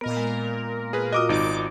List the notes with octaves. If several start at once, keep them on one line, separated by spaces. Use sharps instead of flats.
A#2 B3 A#4 D#5
G#3
G#4 B4
F4 F#4 D#5 D6 D#6
G#1 D#4 D6